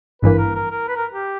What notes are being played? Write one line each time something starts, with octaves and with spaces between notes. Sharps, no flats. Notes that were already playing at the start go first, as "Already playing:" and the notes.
G#1 G2 E3 A#3 B4
A#4
A#4
A#4
B4
A#4
G4